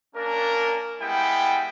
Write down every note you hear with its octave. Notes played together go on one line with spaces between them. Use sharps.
A#3 C#4 D4 A#4
G3 G#3 B3 E4 G5